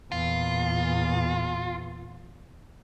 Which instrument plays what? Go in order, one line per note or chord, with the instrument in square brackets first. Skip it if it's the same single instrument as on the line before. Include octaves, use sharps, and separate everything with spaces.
[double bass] E2 A#2 [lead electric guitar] F4